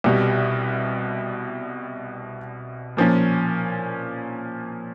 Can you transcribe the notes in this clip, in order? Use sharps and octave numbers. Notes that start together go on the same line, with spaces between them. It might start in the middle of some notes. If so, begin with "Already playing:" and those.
C2 B2 G3
A#2 F3 A#3 C#4